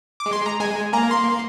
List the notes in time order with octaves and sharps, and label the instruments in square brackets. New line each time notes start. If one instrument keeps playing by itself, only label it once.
[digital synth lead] D6
[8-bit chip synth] G#3
[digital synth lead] C6
A#5
[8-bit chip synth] G#3 [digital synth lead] G#5
[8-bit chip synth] A#3 [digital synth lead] A#5
[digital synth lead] C6